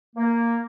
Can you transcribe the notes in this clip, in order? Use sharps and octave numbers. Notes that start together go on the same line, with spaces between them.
A#3